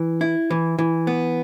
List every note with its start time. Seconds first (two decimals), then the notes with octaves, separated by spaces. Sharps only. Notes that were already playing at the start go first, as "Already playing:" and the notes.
Already playing: E3
0.21 E4
0.50 E3
0.79 E3
1.07 B3